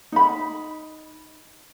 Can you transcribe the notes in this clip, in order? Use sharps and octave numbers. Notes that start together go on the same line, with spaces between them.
D#4 B5